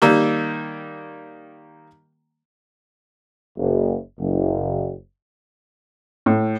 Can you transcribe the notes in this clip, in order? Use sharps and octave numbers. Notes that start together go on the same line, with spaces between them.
D#3 G3 A#3 E6
F#1
F#1
A2